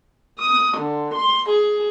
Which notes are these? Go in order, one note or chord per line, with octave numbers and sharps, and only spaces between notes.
D#6
D3
C6
G#4